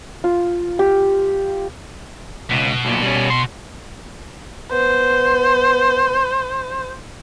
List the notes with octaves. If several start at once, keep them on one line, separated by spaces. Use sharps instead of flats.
F4
G4
C#2 B2
B1 A#2
G3 C#4
C6
B3 C5